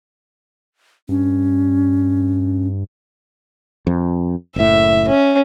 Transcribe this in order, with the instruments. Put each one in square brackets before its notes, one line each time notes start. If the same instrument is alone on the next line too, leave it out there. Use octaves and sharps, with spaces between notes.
[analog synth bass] G2 [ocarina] C#4
[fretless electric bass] F2
[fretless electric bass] F#1 A2 [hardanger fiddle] E5
[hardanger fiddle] C#4